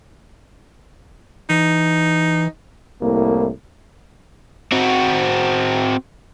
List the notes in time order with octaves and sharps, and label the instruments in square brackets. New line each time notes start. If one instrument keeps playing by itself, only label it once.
[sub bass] E3 [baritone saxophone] D#4
[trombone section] C2 A2 A#3
[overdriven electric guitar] C4 F#4